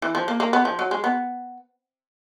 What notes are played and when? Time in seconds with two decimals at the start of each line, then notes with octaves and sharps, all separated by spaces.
0.02 E3
0.15 F3
0.28 A#3
0.40 A#3
0.53 B3
0.65 F3
0.79 F#3
0.91 G#3
1.04 B3